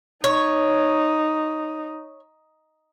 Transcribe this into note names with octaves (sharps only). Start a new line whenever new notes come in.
D#4 C#5